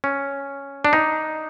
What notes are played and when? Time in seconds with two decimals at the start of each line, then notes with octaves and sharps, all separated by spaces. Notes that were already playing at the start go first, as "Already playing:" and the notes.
0.04 C#4
0.85 D4
0.93 D#4